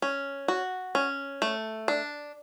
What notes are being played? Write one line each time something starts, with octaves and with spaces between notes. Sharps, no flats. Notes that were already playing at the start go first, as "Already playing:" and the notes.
C#4
F#4
C#4
A3
D4